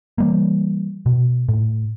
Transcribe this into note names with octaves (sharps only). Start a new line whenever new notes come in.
E3 G3 A#3
B2
A2